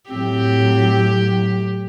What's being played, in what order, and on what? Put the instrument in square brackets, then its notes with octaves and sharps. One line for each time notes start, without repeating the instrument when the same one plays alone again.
[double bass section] A2 F#3 [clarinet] C4 [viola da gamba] G4